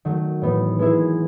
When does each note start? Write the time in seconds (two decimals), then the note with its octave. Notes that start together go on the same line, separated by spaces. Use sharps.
0.05 D#3 F#3 A3
0.42 A2 E3 B3 D#4
0.79 G#3 B3 E4 G#4